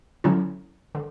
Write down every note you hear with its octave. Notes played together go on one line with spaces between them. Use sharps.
D3 F#3 C#4 E4
D3